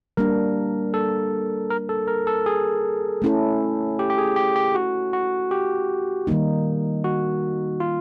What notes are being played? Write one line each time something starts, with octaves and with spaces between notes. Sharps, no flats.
G3 A#3 D4 A#4
A4
A#4
A4
A#4
A4
G#4
A3 C#4 E4 A4
G4
G4
G#4
G4
G4
F#4
F#4
G4
D#3 G3 A#3 D#4
F#4
F4